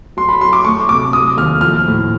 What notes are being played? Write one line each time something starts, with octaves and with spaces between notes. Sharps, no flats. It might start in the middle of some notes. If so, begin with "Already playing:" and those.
F#3 C6
B5
F#3 C6
D6
A3 C#6
C3 D6
F#3 D#6
D#2 F6
F3 F6
A2